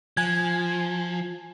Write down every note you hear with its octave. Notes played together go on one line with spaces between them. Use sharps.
F3 G#5 G#6